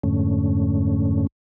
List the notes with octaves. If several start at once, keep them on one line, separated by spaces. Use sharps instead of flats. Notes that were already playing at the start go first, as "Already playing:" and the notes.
F2 G#2 D3 A3 C#4